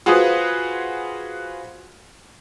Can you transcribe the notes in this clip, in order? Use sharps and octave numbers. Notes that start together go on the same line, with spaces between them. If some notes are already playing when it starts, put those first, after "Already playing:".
F4 F#4 G#4 B4 C5 D#6